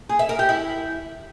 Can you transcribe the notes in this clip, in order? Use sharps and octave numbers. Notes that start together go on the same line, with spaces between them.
G#4
E5
A#4
G4
E4